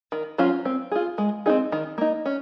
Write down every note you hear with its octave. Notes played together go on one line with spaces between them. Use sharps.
D#3
F#3 C#4 F4 C5
C4
F4 G#4
G#3
C4 D#4 G#4
D#3
A#3 D#4
C#4